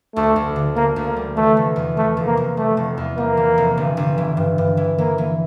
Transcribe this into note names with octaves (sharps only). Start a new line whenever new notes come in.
D2 A3
D2
D3
D3 A#3
D2
A#3
G3
E3 A3
F1
E2
E3 A3
F1
A#3
F1
G3 A3
F1
E2
G3 A#3
E3
F1
G1
G1
E3
G2
G2
E3
E3 A#3
E3